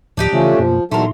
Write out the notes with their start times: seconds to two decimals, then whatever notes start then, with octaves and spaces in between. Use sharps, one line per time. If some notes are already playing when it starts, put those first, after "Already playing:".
0.17 D2 A2 F3 D4 D#4 G4
0.33 C#3 E3 F3 A3 C#4
0.59 F#2 B2 F3 A#3
0.91 E2 A#2 F#3 A3 D#4 A4 A#4 C6